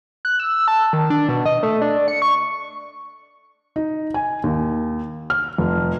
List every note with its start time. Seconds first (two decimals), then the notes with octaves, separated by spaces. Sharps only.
0.25 F#6
0.40 E6
0.68 A5
0.93 D#3
1.10 D4
1.29 B2
1.46 D#5
1.63 A3
1.81 D4
2.08 C#7
2.22 C#6
3.76 D#4
4.14 G#5
4.44 D#2
5.30 F6
5.58 F1